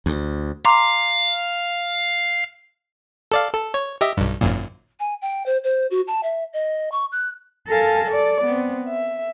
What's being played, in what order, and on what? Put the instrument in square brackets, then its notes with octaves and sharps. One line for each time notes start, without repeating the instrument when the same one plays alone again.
[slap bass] D2
[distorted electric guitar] F5 [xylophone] A#5 C6 D6
[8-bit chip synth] A4 D5 F5
A4
C#5
G4 D#5 E5
B1 G2
G#1 F#2 A#2
[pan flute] G#5
G5
C5
C5
F#4
A5
E5
D#5
C#6
F#6
[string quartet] A4 A#4 F5 G#5 A5
A4 D5
B3 C4
E5